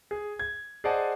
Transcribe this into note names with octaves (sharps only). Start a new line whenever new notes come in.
G#4
G#6
G#4 C5 D5 D#5 F#5 A5